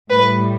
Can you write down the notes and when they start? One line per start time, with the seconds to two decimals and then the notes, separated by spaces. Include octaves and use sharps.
0.10 A2 G3 B4